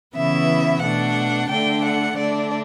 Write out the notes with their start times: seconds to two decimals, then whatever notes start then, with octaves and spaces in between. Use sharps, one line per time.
0.15 C#3 E3 B3 E4 E5
0.82 B2 A3 D4 F#5
1.49 D3 A3 D4 G5
1.84 F#5
2.17 D3 A3 D4 D5